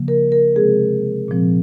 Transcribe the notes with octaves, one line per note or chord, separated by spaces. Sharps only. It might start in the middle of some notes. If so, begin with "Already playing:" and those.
Already playing: C#3 F3 A#3
A#4
A#4
C3 F3 G#3 C4 G#4
A#2 F3 C4